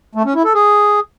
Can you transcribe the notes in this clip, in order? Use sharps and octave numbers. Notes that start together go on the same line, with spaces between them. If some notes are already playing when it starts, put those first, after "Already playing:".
A3
C#4
E4
A4
G#4